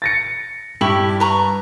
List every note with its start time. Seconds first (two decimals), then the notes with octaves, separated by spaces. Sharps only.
0.02 A6 A#6 C#7
0.81 G2 E4 G4 C#6 B6 F#7
1.20 B4 A#5 C#6